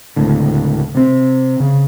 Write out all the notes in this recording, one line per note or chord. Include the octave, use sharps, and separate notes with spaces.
D1 C#2 A2 D3
C3 C4
C#3